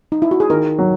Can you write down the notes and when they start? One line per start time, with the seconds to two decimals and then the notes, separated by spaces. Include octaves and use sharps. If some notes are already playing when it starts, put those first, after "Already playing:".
0.12 D#4
0.22 E4
0.31 F#4
0.40 G#4
0.50 D#3 A#4
0.79 F#3